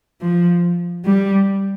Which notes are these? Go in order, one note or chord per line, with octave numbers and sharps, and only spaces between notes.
F3
G3